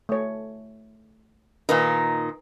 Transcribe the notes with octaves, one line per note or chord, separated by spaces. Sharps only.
A3 C#5
A#2 D#3 D#4 A#4 B4